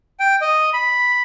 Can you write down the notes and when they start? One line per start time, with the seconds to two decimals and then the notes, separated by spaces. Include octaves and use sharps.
0.20 G5
0.41 D#5
0.73 B5